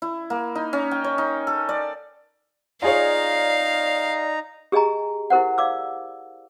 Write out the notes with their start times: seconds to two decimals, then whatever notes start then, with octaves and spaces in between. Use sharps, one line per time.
0.02 E4
0.30 A#3
0.55 D#4
0.73 C#4
0.91 G5
1.04 C#5
1.18 D#4
1.47 A4
1.69 D5
2.82 D#4 F4 G#4 C#5 D5 F5 A#5
4.72 G4 G#4 D#5 G#5 A#5
5.30 E4 G4 A#4 C5 F#5
5.58 D5 F5 D6 E6